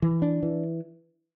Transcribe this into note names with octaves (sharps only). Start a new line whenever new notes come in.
E3
D4
E3